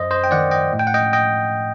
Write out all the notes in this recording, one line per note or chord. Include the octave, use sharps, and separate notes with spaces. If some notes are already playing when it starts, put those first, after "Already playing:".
Already playing: F#2 C5 D#5
C5 D#5
G5
D#3 D5 F#5
D#5 G5
A2
G5
F#5
D#5 G5
D#5 G5